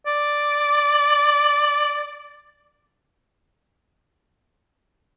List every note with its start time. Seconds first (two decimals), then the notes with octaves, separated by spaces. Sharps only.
0.07 D5